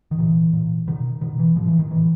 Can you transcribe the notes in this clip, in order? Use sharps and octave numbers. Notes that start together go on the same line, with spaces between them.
D#3
A#2 E3
A#2
B2 D#3
B2 D#3
E3
A2 F3
E3
D#3
A2 E3